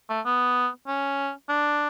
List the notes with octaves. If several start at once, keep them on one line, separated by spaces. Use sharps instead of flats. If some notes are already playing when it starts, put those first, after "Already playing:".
A3
B3
C#4
D4